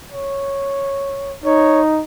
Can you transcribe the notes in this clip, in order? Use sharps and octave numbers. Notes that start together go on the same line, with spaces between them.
C#5
D#4 C#5